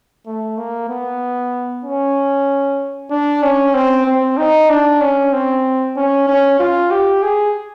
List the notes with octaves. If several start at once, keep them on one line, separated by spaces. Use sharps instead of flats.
A3
A#3
B3
C#4
D4
C#4
C4
C4
D#4
D4
C#4
C4
C#4
C#4
F4
G4
G#4